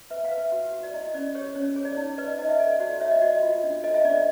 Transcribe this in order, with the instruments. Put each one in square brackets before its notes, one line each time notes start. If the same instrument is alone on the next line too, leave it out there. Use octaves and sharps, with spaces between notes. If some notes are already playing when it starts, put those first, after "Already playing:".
[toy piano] B4 E5
F5
B4
E5
F#4
F#4
D5
E4 D#5
C#4 D5
G4 C#5
C#4 C#5
G#4 C#5
D5
D#4 C#5
B4 D5
D#5
D#4 D#5
E5
A4 D5
F#4 D5
C#5 E5
D#5
F#4 D5
D#5
F4
D4
A4 D#5
E5
D4 D5
D#5